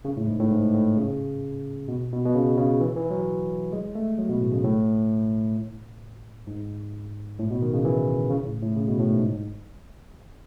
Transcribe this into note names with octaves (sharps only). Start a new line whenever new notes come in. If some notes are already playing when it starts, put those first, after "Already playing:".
C#3
A2
G#2
A2
G#2
G#2
A2
C#3
B2
B2
B2
C#3
C#3
E3
E3
F#3
G#3
A3
F#3
B2
A2
C#3
A2
G#2
A2
B2
D#3
C#3
E3
C#3
A2
A2
C#3
B2
A2
G#2